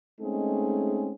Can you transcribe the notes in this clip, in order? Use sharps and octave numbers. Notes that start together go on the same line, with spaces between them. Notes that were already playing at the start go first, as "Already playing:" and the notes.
G#3 A3 C4 C#4 D#4 G#4